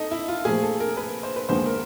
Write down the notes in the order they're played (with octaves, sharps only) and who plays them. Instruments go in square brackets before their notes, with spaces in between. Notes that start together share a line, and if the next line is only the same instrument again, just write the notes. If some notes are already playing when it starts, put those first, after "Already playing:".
Already playing: [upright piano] D#4 A4
E4
F4
[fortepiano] A#2 F3 A3 [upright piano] G#4
[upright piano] A4
A#4
B4
C5
B4
[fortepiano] D#2 D3 F3 G#3 B3 [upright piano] C5
[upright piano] A#4